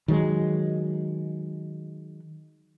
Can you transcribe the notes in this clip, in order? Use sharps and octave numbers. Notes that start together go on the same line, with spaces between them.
D#3 F#3 G#3